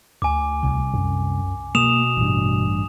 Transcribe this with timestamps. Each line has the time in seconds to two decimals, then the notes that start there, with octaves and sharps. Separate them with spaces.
0.22 D2 G#5 D6
0.63 C2
0.94 F#2
1.75 B2 A#3 D#6 E7 F7
2.17 A1 G2